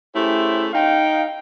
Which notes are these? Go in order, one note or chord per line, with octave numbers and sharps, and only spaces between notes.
A3 C#4 E4 G4 G#4 C5
D#4 F5 G5